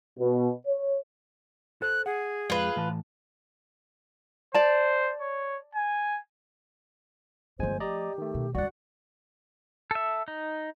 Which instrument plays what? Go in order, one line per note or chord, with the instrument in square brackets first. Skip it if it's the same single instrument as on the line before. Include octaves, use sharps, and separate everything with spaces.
[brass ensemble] B2
C#5
[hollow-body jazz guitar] A4 C5 [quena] F#6
[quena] G#4 [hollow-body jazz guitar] F#5
[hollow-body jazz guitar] F2 G#3 [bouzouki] F4 B4
[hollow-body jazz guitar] A2 E3 A5
[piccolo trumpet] C5 [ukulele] D5 A5
[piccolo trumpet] C#5
G#5
[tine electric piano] G1 G#3 G#5 [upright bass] F3 A3 [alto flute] C5
[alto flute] G4 [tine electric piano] D5 D#5 A#5
[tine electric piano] D#3 A3
[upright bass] B2
[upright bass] D2 G3 [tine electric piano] F#4 F#5 [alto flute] D5
[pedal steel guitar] A4 E5
D#4